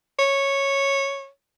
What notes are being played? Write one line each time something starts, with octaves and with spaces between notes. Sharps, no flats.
C#5